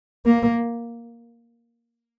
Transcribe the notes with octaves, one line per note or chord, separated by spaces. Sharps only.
A#3